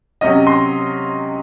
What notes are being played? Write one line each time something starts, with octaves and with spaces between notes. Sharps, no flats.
C3 F#3 C#4 D#5
C6